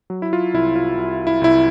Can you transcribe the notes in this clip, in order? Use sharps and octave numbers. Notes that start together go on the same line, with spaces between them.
F#3
E4
F4
C2 E4
F4
C2
E4
C2 E4